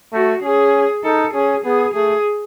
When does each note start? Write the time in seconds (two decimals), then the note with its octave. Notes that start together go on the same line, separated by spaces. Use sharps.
0.13 A3 F#4
0.43 C#4 G#4
1.04 D#4 A4
1.34 C#4 G#4
1.65 B3 G#4
1.94 A3 G#4